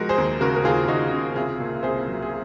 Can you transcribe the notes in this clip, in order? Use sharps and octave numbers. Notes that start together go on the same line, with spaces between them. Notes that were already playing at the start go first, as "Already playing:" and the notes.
Already playing: F3 G#3 F#4 A#4
G#4 C5
D#2
C#3 F#4 A#4
A#4
D#2 F4 G#4
D#2 D#4 F#4
C#3
C2 F4 G#4
A#2
C2 G#4 C5
F#3
G#4